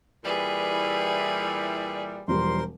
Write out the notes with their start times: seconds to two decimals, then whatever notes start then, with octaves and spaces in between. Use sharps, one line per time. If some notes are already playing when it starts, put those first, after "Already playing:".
0.24 A#2 E3 G3 G#4 B4
0.73 E4
2.28 E1 F3 G3 A#4 C5 C6